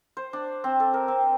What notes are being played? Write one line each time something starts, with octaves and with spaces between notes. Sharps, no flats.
C5
D4
C4
A4
A#4
C4